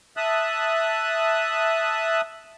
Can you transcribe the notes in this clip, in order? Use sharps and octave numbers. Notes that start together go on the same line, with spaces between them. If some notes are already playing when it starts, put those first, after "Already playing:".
E5 A5 D#6 F#6